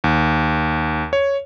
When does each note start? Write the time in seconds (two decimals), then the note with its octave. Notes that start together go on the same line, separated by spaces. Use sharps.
0.04 D#2
1.13 C#5